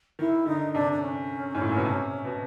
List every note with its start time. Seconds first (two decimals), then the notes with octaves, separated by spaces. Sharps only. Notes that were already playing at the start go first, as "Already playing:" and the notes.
0.19 D#3 E4
0.46 D3 D#4
0.73 C3 D4
0.92 D4
1.02 C#4
1.55 G#2
1.61 A2
1.69 A#2
1.77 B2
1.85 C3
2.25 B2